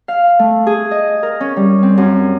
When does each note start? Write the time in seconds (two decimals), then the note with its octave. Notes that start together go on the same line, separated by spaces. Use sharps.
0.08 F5
0.39 A3
0.67 G#4
0.91 D#5
1.23 A#4
1.40 C#4
1.57 G3
1.83 C4
1.98 F#2